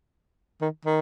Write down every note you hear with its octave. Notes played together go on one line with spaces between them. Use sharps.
D#3
D#3